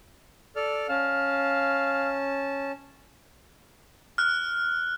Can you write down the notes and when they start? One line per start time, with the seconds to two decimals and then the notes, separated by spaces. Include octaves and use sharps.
0.56 A4 D5 F6
0.89 C#4 F5 A5
4.18 F6 F#6